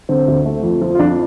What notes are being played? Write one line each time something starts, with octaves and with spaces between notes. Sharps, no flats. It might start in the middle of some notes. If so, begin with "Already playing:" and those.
D3 C4
D2
A3
F2
F3
F4
F2 D4